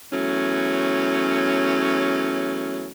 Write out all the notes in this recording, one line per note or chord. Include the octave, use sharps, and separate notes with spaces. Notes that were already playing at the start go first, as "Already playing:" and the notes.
E2 F#3 A3 C#4